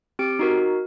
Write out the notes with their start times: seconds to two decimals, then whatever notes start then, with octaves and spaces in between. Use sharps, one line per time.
0.19 C4 G4 D7
0.39 D#4 F#4 A#4